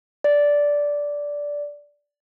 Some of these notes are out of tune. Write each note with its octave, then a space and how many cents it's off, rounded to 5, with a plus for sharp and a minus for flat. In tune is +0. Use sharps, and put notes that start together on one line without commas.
D5 -10